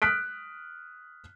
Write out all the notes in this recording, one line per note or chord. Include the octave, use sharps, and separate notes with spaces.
D#6 F6 F#6 B6 D7